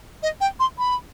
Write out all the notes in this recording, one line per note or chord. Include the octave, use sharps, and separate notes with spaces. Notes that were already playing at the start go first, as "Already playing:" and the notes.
D#5
G5
C6
B5